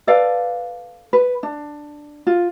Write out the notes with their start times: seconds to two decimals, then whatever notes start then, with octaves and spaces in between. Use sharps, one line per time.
0.07 A4 B4 D5 F5
1.13 B4
1.43 D4
2.27 F4